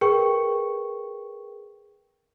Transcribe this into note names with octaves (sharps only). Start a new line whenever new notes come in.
G#4 A#4 B4 G5 C#6